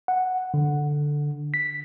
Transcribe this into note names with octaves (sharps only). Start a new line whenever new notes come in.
F#5
D3
B6